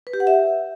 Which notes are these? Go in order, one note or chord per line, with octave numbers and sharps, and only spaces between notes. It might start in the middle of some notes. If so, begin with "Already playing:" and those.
B4
G4
F#5
E5